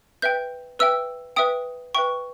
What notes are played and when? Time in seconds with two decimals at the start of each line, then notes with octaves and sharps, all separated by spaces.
0.22 B4 E5 G5 G6
0.79 B4 E5 G5 E6
1.36 B4 E5 G5 D#6
1.95 B4 E5 G5 C#6